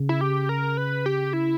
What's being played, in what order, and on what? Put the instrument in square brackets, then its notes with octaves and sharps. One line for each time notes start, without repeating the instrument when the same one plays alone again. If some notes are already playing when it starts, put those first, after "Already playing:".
Already playing: [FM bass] C#3
[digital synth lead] E4
G4
A#4
B4
G4
E4